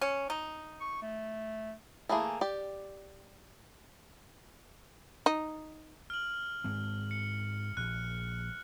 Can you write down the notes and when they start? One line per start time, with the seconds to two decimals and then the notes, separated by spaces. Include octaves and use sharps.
0.01 C#4
0.30 D#4
0.81 C#6
1.02 A3
2.09 E3 A3 A#3 G#4
2.41 G4 D5
5.26 D#4
6.10 F6 F#7
6.64 G#2 G#3 C4
7.11 C#7
7.77 A#1 F#6